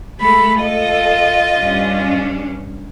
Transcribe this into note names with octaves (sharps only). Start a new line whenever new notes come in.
G#3 A3 A4 B5
F4 A4 D#5
G2 C#4 D4